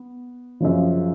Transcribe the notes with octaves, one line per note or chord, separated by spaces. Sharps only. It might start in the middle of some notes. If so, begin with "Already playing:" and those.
Already playing: B3
F#2 C#3 F3